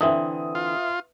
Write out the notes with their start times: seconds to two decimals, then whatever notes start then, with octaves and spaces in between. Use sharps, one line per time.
0.01 D3 E3 C4 B4 E5 D#6
0.55 F4